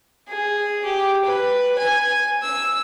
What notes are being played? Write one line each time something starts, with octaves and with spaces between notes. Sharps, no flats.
G#4
G4
B4
G#5
E6